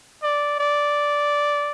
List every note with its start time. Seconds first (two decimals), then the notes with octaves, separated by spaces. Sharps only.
0.23 D5
0.60 D5